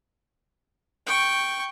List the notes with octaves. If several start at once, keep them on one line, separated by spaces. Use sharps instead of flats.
G5 C#6